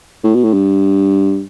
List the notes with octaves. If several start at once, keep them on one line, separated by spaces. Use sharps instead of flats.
A2
B2
A2
G2